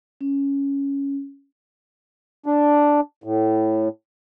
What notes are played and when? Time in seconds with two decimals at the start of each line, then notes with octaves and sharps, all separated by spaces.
0.21 C#4
2.46 D4
3.24 A2